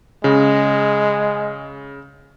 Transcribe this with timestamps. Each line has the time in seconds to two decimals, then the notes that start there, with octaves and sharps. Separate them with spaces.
0.24 C#3 G#3